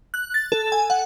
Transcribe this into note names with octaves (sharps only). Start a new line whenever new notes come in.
F#6
A6
A4
G#5
F#5